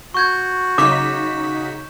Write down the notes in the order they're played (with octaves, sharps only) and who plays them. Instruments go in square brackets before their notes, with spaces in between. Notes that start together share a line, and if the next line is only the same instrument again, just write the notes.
[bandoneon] F#4 [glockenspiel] C#6 G6 G#6
[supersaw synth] C#3 D#4 B6 [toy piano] D6 [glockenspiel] E7